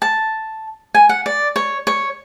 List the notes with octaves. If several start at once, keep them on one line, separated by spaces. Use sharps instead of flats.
A5
G#5
F#5
D5
C#5
C#5